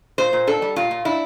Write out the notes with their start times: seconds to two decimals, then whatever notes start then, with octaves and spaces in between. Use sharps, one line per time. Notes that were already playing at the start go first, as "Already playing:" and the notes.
0.18 A#2 C5
0.33 A#2
0.47 D4 A4
0.62 G3
0.76 A#2 F4
0.91 A#2
1.05 D4 E4